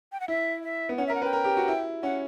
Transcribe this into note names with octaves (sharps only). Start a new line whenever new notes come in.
G5
F#5
E4 E5
E5
B3
C#4 F#5
E5
A#4
F#5
B4 G5
A#4
G4
F#4
E4
C#4 F#5